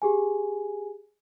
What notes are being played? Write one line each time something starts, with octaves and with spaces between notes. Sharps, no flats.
G4 G#4 G#5